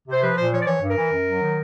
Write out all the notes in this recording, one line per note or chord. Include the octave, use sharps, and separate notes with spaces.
C3 C5
F3 B4
A#2 C5
F3 C#5
D5
E3 C#5
G2
A#4
E3
F#2
F#3
D#3